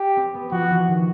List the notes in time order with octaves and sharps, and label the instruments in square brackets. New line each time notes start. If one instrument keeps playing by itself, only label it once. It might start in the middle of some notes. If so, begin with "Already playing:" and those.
Already playing: [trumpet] G4
[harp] C4
B3
[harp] F3 [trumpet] F#4
[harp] E3
D#3